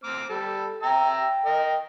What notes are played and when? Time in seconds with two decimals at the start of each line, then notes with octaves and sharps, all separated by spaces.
0.04 C4 D6 F6
0.30 G3 A4
0.83 E5 G5 A#5 E6
1.15 G5
1.46 A#4 D#5